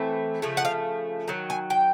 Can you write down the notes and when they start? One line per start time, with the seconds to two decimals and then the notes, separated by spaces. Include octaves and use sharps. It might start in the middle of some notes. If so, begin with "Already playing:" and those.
Already playing: E3 A3 C4
0.42 C#3 F3 A3
0.57 F#5
0.65 F5
1.28 D#3 F#3
1.50 G#5
1.70 G5